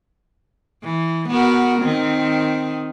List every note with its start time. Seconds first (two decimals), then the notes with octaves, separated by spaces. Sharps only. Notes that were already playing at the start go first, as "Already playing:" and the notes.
0.83 E3
1.29 B3 F#4 A#4
1.79 D#3 C4